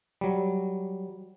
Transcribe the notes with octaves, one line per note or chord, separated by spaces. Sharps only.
F#3 G3